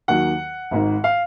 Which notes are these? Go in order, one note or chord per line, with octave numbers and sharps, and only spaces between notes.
D#2 D#3 F#3 F#5
G#1 G#2 D#3
F5